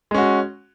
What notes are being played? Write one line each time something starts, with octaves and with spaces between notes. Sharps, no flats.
G#3 C#4 F#4